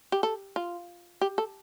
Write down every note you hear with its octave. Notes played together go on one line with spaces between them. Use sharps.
G4
A4
F4
G4
A4